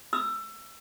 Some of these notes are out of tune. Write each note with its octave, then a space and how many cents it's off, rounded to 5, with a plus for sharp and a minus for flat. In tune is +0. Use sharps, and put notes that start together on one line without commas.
E6 +25